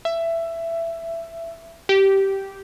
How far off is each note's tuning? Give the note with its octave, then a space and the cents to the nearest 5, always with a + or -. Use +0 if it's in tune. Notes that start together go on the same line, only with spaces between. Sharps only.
E5 +15
G4 -10